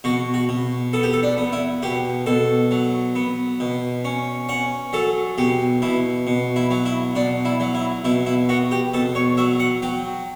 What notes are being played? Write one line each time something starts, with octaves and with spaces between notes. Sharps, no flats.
B2 F#4
F#4
B2
B3 A4
G4
A4
D4
B3
E4
B2 G4
B2 A4
F#3
B3
B2
C#4
C#4 F#5
F#3 A4
B2 G4
B2 E4
B2
E4
F#3
E4
B2 D4
E4
F#3
E4
B2 E4
E4
B3 F#4
G4
B2 A4
C#5
F#3 E5
F#5
F#3 G5